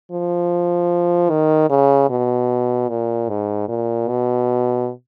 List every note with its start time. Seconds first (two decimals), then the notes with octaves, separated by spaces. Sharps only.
0.12 F3
1.30 D#3
1.70 C#3
2.09 B2
2.89 A#2
3.29 G#2
3.68 A#2
4.08 B2